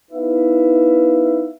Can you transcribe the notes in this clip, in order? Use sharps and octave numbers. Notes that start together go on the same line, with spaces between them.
B3 D#4 E4 B4 E5 F5